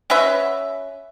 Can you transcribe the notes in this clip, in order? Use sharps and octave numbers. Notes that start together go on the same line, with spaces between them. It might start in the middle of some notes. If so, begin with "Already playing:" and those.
C#4 F#4 B4 E5